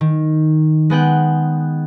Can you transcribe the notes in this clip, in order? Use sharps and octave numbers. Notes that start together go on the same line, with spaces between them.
D#3
G#3 B3 G5 F#6